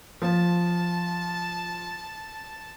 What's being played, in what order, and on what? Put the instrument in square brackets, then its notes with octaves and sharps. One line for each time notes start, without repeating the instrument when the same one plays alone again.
[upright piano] F3 [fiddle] A5